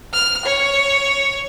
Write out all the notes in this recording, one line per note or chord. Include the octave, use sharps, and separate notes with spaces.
F6
C#5